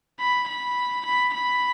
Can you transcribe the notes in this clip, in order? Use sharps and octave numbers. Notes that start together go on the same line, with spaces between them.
B5
B5
B5
B5